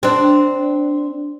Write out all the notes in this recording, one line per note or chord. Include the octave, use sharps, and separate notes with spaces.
C4 D4